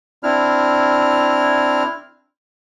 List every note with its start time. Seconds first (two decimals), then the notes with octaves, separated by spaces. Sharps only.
0.23 C4 D4 E4 F6